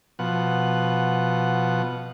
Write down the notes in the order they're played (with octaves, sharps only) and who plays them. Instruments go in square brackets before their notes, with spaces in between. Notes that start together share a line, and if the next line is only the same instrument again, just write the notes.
[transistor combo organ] B2 F3 F#5